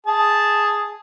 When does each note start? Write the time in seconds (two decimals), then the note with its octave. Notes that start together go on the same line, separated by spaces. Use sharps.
0.07 G#4 A5